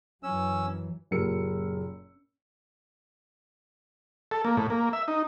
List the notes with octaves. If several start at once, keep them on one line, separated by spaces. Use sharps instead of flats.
F#2 E3 F#3 C#4 E6
F#1 A#2 G4 A#4 E6 C#7
A4
A#3
A2
A#3
E5
D#4